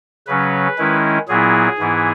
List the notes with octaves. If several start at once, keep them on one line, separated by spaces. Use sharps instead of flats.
C#3 F#3 C#4 B4
D#3 G#3 C#4 E4
A#2 F#3 B3 E4 G#4
G#2 E3 B3 E4